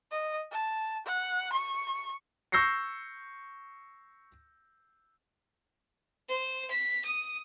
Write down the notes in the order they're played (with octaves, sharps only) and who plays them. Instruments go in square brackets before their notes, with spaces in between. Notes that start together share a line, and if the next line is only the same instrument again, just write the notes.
[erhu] D#5
A5
F#5
C#6
[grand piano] C#6 E6 G6 A#6 C7 C#7
[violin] C5
B6
D#6